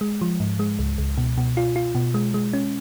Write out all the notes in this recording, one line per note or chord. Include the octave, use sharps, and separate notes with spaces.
G#3
F3
G#2
G#3
C#2
C#2
B2
B2
F4
F4
B2
G#3
G#3
C#4